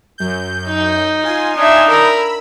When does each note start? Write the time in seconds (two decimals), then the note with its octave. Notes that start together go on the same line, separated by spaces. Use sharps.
0.18 F#2 G6
0.68 D#4
1.23 F4 G#5 C6
1.56 D4 D#4 E5
1.89 A#4 B5 E6